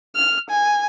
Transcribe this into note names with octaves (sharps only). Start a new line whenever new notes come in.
F6
G#5